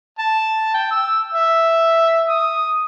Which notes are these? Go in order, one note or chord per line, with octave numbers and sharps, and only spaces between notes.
A5
G5
E6
E5
D#6